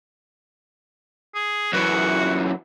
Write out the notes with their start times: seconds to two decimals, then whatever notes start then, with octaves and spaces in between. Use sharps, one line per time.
1.35 G#4
1.73 F#2 E3 F#4